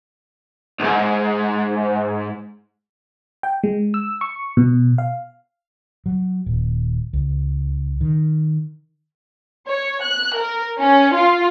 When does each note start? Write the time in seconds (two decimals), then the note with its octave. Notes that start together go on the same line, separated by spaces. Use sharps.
0.80 B1 G#2
3.43 G5
3.63 G#3
3.94 E6
4.21 C#6
4.57 B2
4.98 F5
6.06 F#3
6.46 D#1
7.13 C#2
8.01 D#3
9.70 C#5
10.04 F#6
10.38 A#4
10.80 C#4
11.17 F4